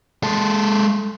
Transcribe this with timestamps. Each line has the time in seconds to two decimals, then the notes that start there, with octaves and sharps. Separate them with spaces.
0.23 G#3 A4